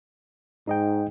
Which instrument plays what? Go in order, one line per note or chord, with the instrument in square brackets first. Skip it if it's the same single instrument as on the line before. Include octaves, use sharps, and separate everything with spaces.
[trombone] G#2 [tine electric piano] D#4 D#5 G5